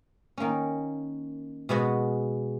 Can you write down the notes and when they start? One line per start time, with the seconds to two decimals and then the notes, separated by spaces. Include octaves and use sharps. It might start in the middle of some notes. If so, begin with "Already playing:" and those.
0.38 D#3 A#3 C#4
1.69 B2 G#3 B3 F#4